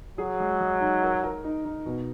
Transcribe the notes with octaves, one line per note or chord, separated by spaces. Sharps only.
F#3 G#4
G#3
G#3
D#4
A#4
A#4
D#4
D#4
B2